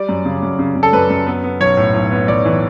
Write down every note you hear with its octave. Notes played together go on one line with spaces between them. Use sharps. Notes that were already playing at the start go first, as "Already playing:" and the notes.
Already playing: G3 D5
F#2
C#3
F#2
C#3
C#3
A4
F#2 B4
F#2
B3
B3
B1 C#5
A2
B1
B3
B1 D5
E3